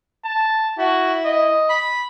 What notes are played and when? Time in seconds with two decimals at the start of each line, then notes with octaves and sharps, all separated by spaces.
0.24 A5
0.78 E4 F#4
1.25 D#5
1.70 B5